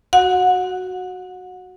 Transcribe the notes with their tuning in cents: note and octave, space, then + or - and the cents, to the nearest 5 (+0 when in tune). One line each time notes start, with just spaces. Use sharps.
F#4 +0 F#5 -30